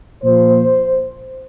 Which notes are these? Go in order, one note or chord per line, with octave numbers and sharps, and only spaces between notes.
A#2 F3 C5